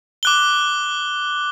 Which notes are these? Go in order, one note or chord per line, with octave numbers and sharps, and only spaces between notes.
D6 F#6 G7